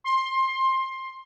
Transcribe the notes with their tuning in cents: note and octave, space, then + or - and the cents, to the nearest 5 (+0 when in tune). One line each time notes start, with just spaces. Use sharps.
C6 +20